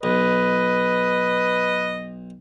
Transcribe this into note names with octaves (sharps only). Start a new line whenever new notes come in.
B1 B4 D#5